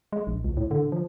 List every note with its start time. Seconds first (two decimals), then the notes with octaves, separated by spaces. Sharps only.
0.12 G#3
0.27 A#1
0.44 C#2
0.57 A2
0.71 D3
0.92 F3